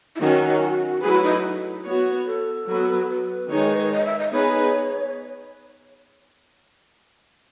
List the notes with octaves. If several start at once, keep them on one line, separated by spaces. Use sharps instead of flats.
E4
D#3 F#3 C#4 F#4
F#4
F#3 A3 E4 G#4 B4
F#4
D#4
B3 F#4 C#5
A4
F#3 B3 F#4 B4
B4
D#3 G#3 D#4 G#4 C#5
D#5
E5
D#5
B3 D#4 G#4 B4 C#5